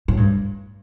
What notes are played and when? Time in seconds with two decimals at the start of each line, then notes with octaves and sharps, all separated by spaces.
0.08 A2
0.17 G2